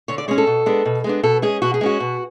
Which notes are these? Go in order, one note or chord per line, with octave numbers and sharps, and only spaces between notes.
D3 C#5
D5
G#3 C#4 C#5
A4
B2
G#3 B3 D4
B2
G#3 B3 D4
B2 A4
G#3 C#4 G#4
B2 F#4
G#4
G#3 C#4 F#4
B2